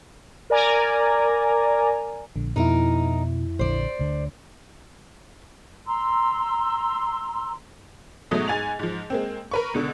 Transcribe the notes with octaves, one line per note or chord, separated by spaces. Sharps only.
A#4 D5 G#5 A#5
A#1 D3
F2 B2 D#4 E4 A#4
A#1 D3 C5 D5
D2 D3
A#5 C6 E6
G#2 B2 F#3 A3 D#6
G#2 G#5 A6 F7
G#2 F3
G#3 A#3 C4
A#4 B4 C#6
C#2 B2 D3